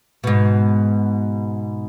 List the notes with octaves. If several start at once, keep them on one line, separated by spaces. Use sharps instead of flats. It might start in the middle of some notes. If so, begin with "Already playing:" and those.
G#2 B2